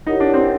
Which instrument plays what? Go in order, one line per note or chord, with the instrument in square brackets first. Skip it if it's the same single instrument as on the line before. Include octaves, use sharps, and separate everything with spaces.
[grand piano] D#4 [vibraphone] E4 G4 A#4 C#5 F#5
[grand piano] D4
C4